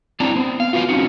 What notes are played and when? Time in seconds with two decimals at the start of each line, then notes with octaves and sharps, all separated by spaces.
0.20 C4 D4 E4 D5 A5 A#5
0.36 B3 C5
0.60 F5
0.73 F4 F#4 B4 E5 F5
0.89 C4 C#4 D#4 F#4